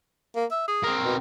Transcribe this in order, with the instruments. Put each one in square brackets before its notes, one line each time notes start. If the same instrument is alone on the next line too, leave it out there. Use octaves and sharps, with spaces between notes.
[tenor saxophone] A#3
E5
G#4
[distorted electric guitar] C4 A#4
[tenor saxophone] B2